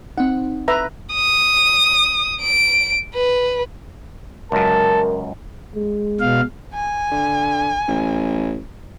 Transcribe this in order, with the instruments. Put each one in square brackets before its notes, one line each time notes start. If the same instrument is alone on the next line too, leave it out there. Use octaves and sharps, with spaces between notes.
[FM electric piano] C4 D#4 [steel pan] F#5
[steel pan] B4 E5 A#5
[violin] D#6
D7
B4
[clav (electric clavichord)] C#2 F#2 [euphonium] A#4 [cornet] A5
[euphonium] G#3
[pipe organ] B2 F5
[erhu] G#5
[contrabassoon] D3
A1